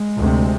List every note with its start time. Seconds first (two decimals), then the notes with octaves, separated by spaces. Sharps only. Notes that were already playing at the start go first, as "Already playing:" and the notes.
Already playing: G#3
0.16 D2 C3